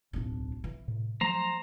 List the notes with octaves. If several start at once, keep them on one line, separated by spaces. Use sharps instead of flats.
D1 B1 D4
E3
A2 C3
F3 F#3 A3 C5 A#5